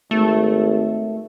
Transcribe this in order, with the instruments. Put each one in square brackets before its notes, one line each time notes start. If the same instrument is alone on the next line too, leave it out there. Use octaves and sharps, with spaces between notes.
[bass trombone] G#1 [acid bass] A3